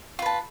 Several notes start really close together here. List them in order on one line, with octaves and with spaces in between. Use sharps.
F4 B4 A5